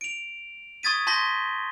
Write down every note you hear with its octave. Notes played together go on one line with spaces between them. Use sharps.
D7 F7
C#6 D#6 G#6 A6 B6 D#7
A5 C6 G6 A#6 B6 G7